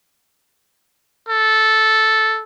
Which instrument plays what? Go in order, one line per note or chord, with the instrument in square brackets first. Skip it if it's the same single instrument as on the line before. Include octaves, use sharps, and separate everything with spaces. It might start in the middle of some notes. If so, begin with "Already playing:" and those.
[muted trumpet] A4